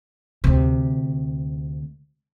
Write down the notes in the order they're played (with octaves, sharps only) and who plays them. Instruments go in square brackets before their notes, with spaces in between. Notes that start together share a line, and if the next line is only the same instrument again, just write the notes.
[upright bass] D2 C3